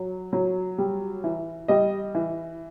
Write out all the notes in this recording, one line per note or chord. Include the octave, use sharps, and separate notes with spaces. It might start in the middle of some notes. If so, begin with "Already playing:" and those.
Already playing: F#3
F#3
G3
E3
G3 D#5
E3